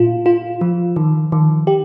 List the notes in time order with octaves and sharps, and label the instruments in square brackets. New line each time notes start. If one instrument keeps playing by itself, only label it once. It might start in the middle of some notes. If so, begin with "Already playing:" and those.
Already playing: [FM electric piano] A#2 F4
F4
F3
D#3
D#3
G4